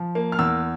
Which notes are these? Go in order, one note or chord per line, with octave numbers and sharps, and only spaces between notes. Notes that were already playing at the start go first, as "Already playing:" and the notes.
Already playing: F3
A#3
F6
E2 E6